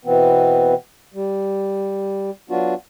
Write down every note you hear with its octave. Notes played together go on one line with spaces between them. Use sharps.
B2 E3 B3 C4
G3
F#3 B3 D4 F4 F#4